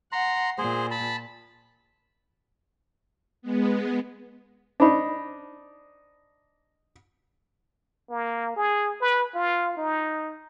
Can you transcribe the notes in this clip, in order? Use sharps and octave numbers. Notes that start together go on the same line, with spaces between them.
F#5 A#5 C6
A#2 G#4 C5
A5 B5
G#3 B3
D4 D#4 C5 B5
A#3
G#4
B4
F4
D#4